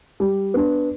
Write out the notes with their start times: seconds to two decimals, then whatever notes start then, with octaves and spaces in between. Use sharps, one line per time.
0.20 G3
0.54 B3 D4